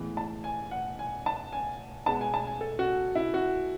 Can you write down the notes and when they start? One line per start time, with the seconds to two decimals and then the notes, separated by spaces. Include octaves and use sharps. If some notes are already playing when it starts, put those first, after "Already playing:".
Already playing: A2 E3 G#3 B3
0.17 A5
0.44 G#5
0.71 F#5
0.99 G#5
1.26 A5
1.53 G#5
2.06 B2 G#3 B3 A5
2.21 G#5
2.34 A5
2.47 G#5
2.61 A4
2.79 F#4
3.15 E4
3.34 F#4